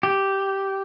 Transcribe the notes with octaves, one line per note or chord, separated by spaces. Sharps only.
G4